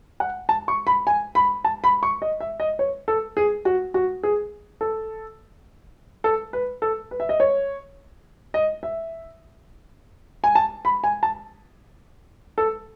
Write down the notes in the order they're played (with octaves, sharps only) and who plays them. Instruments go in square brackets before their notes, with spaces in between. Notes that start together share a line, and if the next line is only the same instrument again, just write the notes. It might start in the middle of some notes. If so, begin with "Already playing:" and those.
[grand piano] F#5
A5
C#6
B5
G#5
B5
A5
B5
C#6
D#5
E5
D#5
C#5
A4
G#4
F#4
F#4
G#4
A4
A4
B4
A4
B4
E5
D#5
C#5
D#5
E5
G#5
A5
B5
G#5
A5
A4